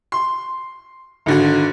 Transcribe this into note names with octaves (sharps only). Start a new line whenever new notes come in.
C6
G#1 D3 F#4